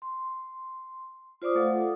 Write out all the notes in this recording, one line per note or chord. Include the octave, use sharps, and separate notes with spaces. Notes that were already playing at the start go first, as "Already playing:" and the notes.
C6
F4 C5 D5 D6 D#6
A3 A4 F5 F#5